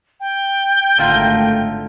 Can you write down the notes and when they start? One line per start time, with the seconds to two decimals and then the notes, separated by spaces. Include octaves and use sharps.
0.20 G5
0.98 G#1 D3 A3 F4 A#4